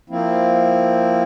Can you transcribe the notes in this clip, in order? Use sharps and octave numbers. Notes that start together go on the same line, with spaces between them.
F3 A#3 C4 E4